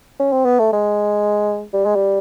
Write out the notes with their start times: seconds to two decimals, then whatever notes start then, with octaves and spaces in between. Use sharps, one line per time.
0.19 C#4
0.32 C4
0.45 B3
0.60 A3
0.73 G#3
1.73 G3
1.85 G#3
1.96 G3